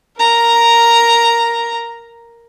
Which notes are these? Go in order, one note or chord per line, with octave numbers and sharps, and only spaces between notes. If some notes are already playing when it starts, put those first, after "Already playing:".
A#4 A#5